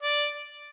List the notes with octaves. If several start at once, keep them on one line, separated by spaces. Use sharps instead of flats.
D5